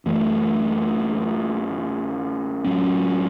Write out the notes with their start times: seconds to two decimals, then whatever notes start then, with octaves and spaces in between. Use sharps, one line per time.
0.05 F#2 E3 A3
2.65 A2 F#3 C#4